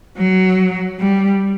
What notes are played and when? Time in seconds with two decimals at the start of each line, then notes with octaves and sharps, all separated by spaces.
0.17 F#3
0.99 G3